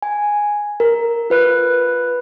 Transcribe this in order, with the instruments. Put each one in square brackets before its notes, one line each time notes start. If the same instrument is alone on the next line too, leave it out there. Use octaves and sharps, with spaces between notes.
[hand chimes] G#5
A#4
F4 B4 F#6